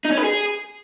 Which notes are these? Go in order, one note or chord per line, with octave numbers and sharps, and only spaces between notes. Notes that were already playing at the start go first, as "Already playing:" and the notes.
D#4
C#4
B4
G#4